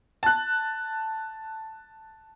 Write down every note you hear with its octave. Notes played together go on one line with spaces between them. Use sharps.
A5 F#6